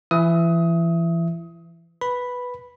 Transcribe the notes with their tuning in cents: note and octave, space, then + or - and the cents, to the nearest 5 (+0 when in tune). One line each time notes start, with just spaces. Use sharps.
E3 +30 E5 +15 D#6 +25
B4 +0 B5 +0